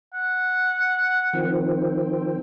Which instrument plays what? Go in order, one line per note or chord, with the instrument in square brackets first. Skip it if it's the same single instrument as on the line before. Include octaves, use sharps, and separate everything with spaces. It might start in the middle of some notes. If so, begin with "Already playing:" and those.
[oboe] F#5
[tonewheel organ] D#3 F3 C4